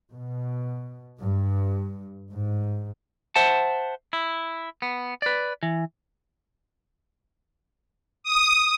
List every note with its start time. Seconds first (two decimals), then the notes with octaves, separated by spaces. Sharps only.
0.12 B2
1.20 G2
2.32 G#2
3.36 C5 E5 F#5 A5
4.13 E4
4.82 B3
5.22 B4 D5
5.63 E3
8.23 D#6